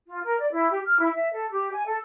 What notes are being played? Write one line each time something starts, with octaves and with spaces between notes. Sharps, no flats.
F4
A#4
D5
E4
G4
F6
E4
E5
A4
G4
G#5
A4